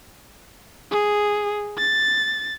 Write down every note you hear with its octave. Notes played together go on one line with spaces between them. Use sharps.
G#4
A6